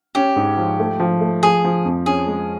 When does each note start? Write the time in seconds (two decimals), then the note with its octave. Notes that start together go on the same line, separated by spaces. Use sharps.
0.15 C#4 G4
0.36 G#2
0.57 F3
0.79 A3
1.00 F3
1.21 A3
1.43 F3 G#4
1.64 F3
1.85 F2
2.06 C#4 G#4
2.27 G#3